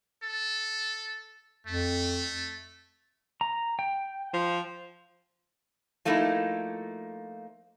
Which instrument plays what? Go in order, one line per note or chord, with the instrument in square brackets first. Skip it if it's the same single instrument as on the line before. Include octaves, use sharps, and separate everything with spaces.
[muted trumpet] A4
[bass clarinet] F2 [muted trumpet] A3
[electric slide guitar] A#5
G5
[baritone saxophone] F3
[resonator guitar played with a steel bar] F3 A3 A#3 D#4 E4